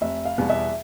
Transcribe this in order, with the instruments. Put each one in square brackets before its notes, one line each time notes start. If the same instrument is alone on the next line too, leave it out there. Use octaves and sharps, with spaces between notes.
[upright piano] F1 [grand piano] E5
[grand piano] F5
[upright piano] E2 B2 G3 B3
[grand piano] E5